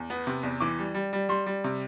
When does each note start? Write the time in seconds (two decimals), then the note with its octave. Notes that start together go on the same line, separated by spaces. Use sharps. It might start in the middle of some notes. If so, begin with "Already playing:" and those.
Already playing: E2
0.10 B3
0.27 C3
0.43 E2
0.60 E3 D6
0.79 G3
0.95 G3
1.13 G3
1.29 G3 C6
1.46 G3
1.64 C3